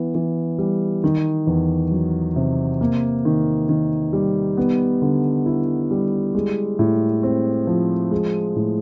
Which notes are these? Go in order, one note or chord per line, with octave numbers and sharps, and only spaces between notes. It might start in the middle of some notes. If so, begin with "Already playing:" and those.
Already playing: E3 B3
E3
G3
D#3
E2
F#3
C3
A#3
D#3
D#3
G3
B3
D3
E4
G3
G#3
A2
C4
F3
G#3
A2